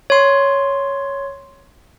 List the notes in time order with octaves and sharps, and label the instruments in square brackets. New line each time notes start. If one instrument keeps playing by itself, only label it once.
[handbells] C#5 C6